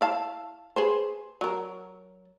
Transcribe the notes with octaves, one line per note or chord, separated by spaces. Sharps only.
E4 F5 A5
G#4 B4 C5
F#3 A#4